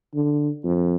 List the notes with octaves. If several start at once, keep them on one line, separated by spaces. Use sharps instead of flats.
D3
F2